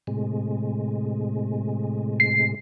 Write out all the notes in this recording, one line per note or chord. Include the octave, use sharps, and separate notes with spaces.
A2 C3 G#3
C7